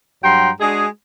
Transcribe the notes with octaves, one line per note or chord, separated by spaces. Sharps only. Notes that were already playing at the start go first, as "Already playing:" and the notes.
G2 F#3 F#5 G5 A#5 C6
G#3 D4 F#4 G#4